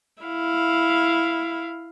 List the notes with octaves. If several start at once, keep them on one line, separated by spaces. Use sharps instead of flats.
E4 F5